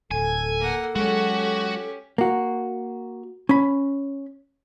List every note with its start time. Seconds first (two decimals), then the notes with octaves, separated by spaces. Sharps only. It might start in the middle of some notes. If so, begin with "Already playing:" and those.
0.11 D1 A4 G#5
0.60 A#3 F#5
0.96 F#3 G#3 C#4 F#4 G4
2.18 A#3 F#4
3.49 C#4 B5